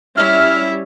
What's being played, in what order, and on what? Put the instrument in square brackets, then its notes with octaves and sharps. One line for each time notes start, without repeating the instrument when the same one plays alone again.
[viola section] G3 C#4 [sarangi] E4 [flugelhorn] E5 [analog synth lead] F6